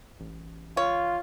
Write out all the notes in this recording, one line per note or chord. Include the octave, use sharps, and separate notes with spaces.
A1
F4 C#5